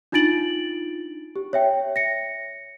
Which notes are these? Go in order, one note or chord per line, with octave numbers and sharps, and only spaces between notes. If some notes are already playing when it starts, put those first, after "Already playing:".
D4 D#4 F4 A6 D7 F#7
G4
C#5 E5 G5
A#6 C#7